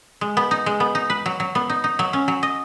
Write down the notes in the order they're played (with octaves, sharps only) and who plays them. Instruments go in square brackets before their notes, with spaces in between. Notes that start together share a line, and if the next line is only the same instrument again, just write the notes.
[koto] G#3
B3
D#4
G#3
B3
D#4
B4
F#3
F#3
B3
D#4
D#4
F#3
C#4
F#3
D#5